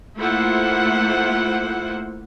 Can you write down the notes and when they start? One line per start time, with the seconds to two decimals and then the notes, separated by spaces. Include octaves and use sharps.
0.16 A3 A#3 E4 F4 C5 F#5